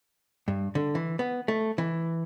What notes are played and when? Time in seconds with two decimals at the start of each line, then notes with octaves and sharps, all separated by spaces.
0.48 G2
0.75 D3
0.95 E3
1.19 B3
1.48 A3
1.78 E3